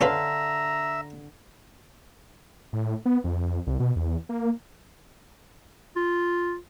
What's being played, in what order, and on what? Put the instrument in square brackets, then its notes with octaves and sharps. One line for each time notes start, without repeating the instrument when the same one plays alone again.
[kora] D3 F5 [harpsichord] C#4 F4 B4 [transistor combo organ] E5 [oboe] A#5
[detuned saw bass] A2
B3
F2
C2
B2
E2
A#3
[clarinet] F4